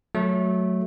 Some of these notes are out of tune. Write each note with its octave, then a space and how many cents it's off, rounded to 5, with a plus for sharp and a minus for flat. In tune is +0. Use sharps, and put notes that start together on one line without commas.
F#3 +0 A3 -10